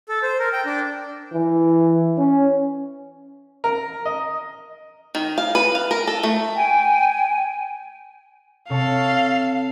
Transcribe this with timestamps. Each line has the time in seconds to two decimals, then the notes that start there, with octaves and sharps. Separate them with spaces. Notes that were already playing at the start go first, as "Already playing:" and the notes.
0.09 A4
0.23 C5
0.39 A#4
0.53 G5
0.66 D4
1.33 E3
2.18 C#4
3.64 A#4
4.05 D#5
5.15 D#3
5.38 F5
5.55 B4
5.75 F5
5.91 A#4
6.07 A4
6.23 A3
6.55 G5 G#5
8.69 C3 A4 C#5 F5 A5